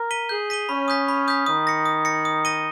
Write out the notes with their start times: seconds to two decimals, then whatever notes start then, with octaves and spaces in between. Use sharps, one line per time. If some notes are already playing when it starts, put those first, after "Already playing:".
Already playing: A#4
0.11 B6 D#7 G7
0.29 G#4 G6
0.50 B6 D#7 G7
0.69 C#4 B5
0.88 D#6 G6 B6
1.08 B5
1.28 D#6 G6 B6
1.46 D#3 D#6
1.67 A#6 C#7
1.85 D#6
2.05 A#6 C#7
2.25 D#6
2.45 A#6 D#7 G7